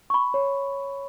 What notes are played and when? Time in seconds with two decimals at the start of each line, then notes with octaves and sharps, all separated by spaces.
0.10 C#6
0.14 B5
0.34 C#5